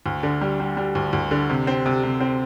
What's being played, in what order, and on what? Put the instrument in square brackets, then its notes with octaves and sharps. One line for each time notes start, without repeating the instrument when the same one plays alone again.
[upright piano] D2
D3
G3
G3
G3
D2
D2
D3
C3
C4
C3
C3
C4